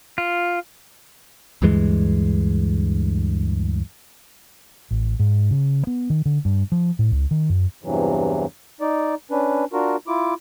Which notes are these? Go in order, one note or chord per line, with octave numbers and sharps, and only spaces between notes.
F4
D2 G2 E3 G#3
A1
G#2
C#3
B3
D#3
D3
G2
F3
A2
C#2
D#3
F#2
E2 G2 C3 E3 F#3
D#4 D5
C#4 D4 B4
D4 F4 F#4 A#4
E4 F4 D6